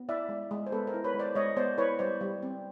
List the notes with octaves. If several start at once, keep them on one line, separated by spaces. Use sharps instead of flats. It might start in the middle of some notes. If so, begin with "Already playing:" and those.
Already playing: B3
E4 D5 E5
G#3
G#3
C5
B3 A4 B4
A#4 C5
E4
B4 C#5
G#3
C5 D5
G#3 C#5 D#5
B3 C5 D5
E4 B4 C#5
G3 C5 D5
G3
C4